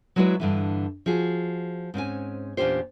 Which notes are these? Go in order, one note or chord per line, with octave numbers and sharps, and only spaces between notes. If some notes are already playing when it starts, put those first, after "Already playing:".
F#3 G#3 E4 F#4 B4 D5
G2 D3 E3
F3 F#4 G#4
G#2 C4 C#4 G#5
E2 A#2 C#4 D4 G4 C5